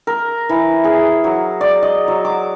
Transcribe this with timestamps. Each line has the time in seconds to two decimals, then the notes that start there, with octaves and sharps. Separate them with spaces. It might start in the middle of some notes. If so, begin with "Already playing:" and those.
0.07 A#4
0.49 E3
0.84 G#4
1.24 F#3
1.61 D5
1.83 D#5
2.08 F#3
2.25 D6